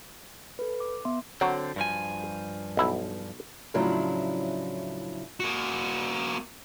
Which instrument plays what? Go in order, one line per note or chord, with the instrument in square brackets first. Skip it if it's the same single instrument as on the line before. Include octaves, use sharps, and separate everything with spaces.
[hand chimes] A4 B4
D6
B3 E5 C6
[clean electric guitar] D3 C4 [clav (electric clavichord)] F#3
[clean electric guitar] G2 F3 G#5
[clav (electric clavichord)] B1 E4
[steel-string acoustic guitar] A2 C#3 F3 F#3 D4 E4
[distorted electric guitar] A#3 F#4